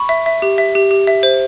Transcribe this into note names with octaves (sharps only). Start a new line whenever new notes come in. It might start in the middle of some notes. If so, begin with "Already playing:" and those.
Already playing: B5 C#6
E5
E5
G4
E5
G4
G4
E5
C5